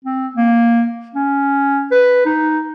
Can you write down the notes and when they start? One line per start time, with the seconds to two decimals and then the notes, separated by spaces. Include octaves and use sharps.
0.05 C4
0.36 A#3
1.15 C#4
1.91 B4
2.25 D#4